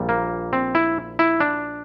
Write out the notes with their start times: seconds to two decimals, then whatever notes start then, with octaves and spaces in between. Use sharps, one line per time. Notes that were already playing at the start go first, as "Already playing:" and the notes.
Already playing: A#1 A#2 G3
0.09 A#3
0.53 C4
0.75 E4
1.19 E4
1.40 D4